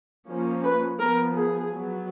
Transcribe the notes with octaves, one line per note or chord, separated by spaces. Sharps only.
F3 A#3 C#4
B4
F3 B3 A#4
G#4
F#3 B3